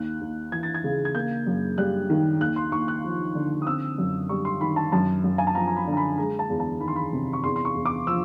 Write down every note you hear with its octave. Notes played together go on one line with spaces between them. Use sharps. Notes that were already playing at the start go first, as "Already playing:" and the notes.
Already playing: D#2 F#6
D#2
E3 G#6
A6
G#6
C#3
G#6
A#3 G6
F#2
G3 F#6
D#3
D#2 F#6
C6
D#2 C#6
F#6
F3
D3
D#6
C4 E6
F#2
G3 C#6
C6
D#3 B5
A5
F#2 A5
F#2
G#5
A5
F3 A#5
A#5
B5
D3
A#5
B5
G#3 A#5
A5
E2
A5
D#3 B5
C6
B5
C3
C#6
E2 C6
C6
C#6
E2
D6
F3 E6